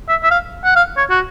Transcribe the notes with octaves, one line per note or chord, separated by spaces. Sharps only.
E5
E5
F5
F#5
F5
C#5
F#4